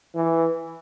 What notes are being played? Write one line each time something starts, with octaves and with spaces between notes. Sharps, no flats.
E3